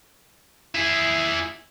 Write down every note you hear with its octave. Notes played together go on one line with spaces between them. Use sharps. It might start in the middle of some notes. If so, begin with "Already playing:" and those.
E4 G#4